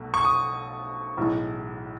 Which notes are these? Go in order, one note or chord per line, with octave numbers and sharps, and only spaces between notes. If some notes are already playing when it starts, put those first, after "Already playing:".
Already playing: B1 B2 A3
C#6
D#6
B1 A2 E3 G#3